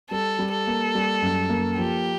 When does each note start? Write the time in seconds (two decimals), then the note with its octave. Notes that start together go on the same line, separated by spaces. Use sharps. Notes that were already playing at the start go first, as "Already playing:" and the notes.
0.11 G3 A4
0.39 G3
0.52 A4
0.67 A#3
0.95 G3
1.22 F#2
1.49 A#3
1.78 F3 G4